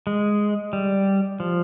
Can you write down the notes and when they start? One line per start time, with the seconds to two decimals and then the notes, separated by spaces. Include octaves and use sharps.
0.07 G#3
0.73 G3
1.40 F3